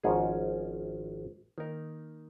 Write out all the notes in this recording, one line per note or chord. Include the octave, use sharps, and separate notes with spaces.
G#1 G#2 F3 C#4 G#4
D#3 A#3 D#4 A#4